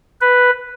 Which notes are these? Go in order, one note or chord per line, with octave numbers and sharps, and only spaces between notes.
B4